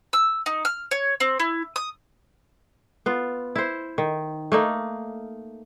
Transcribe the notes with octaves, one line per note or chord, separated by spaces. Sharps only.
E6
D#4
F6
C#5
C4
E4
D#6
B3 F4
E4 C5
D#3
A3 A#3 D#4